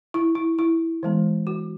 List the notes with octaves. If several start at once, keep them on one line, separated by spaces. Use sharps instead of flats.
E4
E4
E4
E3 G#3 B3
F#4